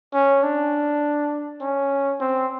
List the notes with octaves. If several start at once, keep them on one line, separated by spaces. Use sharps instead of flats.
C#4
D4
C#4
C4